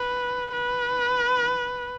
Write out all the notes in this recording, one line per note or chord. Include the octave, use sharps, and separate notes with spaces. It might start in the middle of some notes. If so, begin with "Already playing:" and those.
Already playing: B4
B4